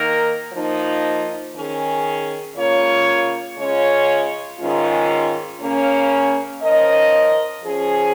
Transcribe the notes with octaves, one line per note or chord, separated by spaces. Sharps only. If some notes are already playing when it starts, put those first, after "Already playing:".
Already playing: D#3 A#3 D#4 A#4
F3 A#3 D#4
D#3 C#4 G#4
C#3 A#3 F4 C#5
C#3 G#3 C#4 F4 C#5
G#2 D#3 G#3 C#4 F4
C#3 A#3 C#4
F3 C#4 A#4 D#5
F3 C#4 G#4